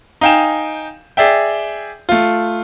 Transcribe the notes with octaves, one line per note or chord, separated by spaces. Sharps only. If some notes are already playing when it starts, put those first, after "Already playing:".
D#4 F5 G5 G#5 E7
G#4 D5 E5 G5
A3 F4